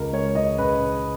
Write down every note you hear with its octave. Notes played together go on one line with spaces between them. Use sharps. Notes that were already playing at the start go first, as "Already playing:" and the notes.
Already playing: C#2 A#4
G#3 C#5
C#2 D#5
C#3 B4